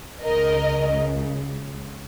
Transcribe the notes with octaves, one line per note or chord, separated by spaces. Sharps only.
C#2 C#3 A#4 D#5